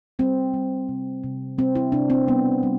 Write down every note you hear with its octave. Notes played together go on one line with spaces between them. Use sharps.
G3 C4
G3
C3
C3
G3 C4
E4
C3 D4
C4
G3 B3
G3